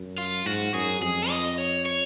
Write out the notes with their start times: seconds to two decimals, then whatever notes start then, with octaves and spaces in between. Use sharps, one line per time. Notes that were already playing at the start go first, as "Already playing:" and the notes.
Already playing: F#2
0.18 F4
0.45 G#2 F#4
0.74 F#2 G#4
1.01 F2 G#4
1.30 D#5
1.58 C#5
1.86 C#5